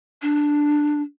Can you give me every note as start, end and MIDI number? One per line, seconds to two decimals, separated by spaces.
0.22 1.02 62